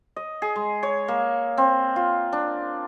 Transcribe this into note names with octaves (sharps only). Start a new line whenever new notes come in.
D#5
G#4
G#3
C#5
A#3
C4
F4
D4